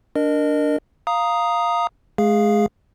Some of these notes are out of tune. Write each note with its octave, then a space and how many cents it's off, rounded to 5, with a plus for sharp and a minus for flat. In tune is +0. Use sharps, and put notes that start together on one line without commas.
D4 -10 A#4 +0 D#5 -25
F5 +0 A#5 +0 D#6 +0
G#3 +35 G#4 -10 F5 +0